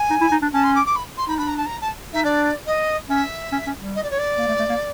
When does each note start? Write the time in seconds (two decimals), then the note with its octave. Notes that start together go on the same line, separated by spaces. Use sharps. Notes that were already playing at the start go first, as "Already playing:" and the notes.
Already playing: G#5
0.10 D#4
0.21 E4
0.32 D#4
0.42 D4
0.53 C#4 A5
0.64 C6
0.75 D6
0.86 D6
0.96 B5
1.18 C6
1.28 D#4 B5
1.38 D4 B5
1.48 A#5
1.57 A5
1.66 A#5
1.81 A5
2.13 D#4 E5
2.24 D4 D5
2.66 D#5
3.09 C#4 E5
3.52 C#4
3.67 C#4
3.81 G3
3.95 D#5
4.03 D5
4.10 C#5
4.18 D5
4.38 A#3
4.48 A3
4.59 A3
4.70 A#3